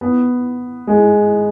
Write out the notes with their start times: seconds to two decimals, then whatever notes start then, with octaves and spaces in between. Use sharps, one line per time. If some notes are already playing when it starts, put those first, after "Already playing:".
0.01 B3
0.87 G#3